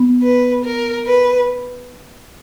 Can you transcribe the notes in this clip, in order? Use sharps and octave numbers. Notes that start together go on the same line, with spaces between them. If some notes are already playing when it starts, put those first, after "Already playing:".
Already playing: B3
B4
A#4
B4